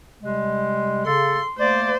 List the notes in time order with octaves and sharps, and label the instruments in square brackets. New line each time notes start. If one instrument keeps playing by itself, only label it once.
[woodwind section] C3 G3 G#3
[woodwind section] C#3 A4 [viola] C6
[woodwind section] A3 A#3 D5 [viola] C5